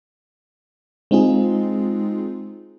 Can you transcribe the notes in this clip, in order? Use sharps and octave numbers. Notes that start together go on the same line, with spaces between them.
G#3 C4 D#4 F4 G#4